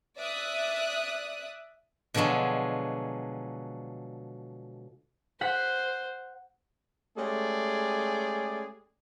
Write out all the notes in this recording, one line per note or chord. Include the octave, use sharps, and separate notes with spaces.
D5 E5 D#6 F#6
B2 D3 F3 F#3 G#3
C5 F#5 B6
G#3 A3 C#4 G4 G#4 D5